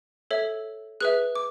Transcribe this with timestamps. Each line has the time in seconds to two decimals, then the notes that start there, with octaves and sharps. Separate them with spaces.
0.31 A4 C#5 E5
1.00 G#4 B4 E5 F#6
1.35 D6